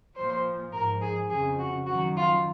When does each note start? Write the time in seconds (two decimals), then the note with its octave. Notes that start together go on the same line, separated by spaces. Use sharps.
0.15 A#2 F3 C5
0.72 G#2 A#4
0.76 F3
1.01 G#4
1.29 F2 C#3 F3 G#4
1.58 F#4
1.86 F#2 D#3 F#3 F#4
2.16 F4